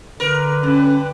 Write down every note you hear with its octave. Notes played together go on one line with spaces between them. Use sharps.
D3 A#4 B4
G2 C#4